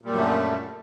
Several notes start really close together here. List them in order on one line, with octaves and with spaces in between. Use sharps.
A#2 G3 F#2 D3 A3